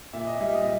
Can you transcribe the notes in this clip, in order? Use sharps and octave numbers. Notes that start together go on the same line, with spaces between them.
A#2 E5
D#5
G3 E5
D#5